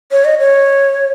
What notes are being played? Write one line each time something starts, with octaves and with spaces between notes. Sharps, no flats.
C#5
D#5
C#5